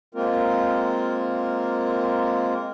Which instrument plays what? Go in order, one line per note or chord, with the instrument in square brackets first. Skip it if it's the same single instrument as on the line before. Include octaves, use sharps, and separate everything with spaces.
[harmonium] G#3 A#3 C4 F4 A#4